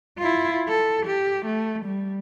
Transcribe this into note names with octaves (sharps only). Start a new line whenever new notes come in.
E4 F4
A4
G4
A3
G3